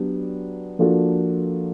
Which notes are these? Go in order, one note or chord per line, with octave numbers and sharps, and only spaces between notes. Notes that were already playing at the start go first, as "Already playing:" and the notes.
Already playing: F#3 B3 D4 G4
F3 A#3 D4 F#4 A4